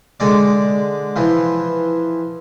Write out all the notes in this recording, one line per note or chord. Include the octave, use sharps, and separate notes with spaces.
D3 G#3 D5
E3 F3